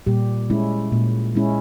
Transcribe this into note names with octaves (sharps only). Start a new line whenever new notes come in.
A#2 G3 G4
G#3 C#4 E4
A#2
G#3 C#4 E4